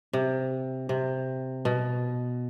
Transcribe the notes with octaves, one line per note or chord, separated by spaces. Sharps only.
C3
C3
B2